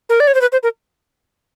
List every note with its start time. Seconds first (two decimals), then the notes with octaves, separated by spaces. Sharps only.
0.09 A#4
0.20 D5
0.27 C#5
0.34 C5
0.41 B4
0.52 C5
0.63 A#4